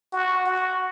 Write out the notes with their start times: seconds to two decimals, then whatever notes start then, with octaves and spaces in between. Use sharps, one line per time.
0.13 F#4
0.46 F#4